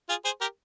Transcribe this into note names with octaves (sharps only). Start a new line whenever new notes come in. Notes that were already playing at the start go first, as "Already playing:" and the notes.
F4 G#4
G#4 C5
G4 A#4